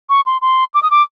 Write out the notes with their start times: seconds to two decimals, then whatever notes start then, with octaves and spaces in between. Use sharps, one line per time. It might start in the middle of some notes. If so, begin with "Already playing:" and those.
0.09 C#6
0.26 C6
0.42 C6
0.74 D6
0.83 D#6
0.91 D6